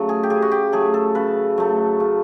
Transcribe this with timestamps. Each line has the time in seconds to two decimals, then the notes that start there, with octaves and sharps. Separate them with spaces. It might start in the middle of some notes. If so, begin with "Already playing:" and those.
Already playing: C#3 F#3 A3
0.09 G#4
0.23 G4
0.30 C#3 G#4
0.42 F#4
0.51 G4
0.72 F#3 A3 G#4
0.94 A4
1.15 C#3 B4
1.58 F#3 A3
2.00 C#3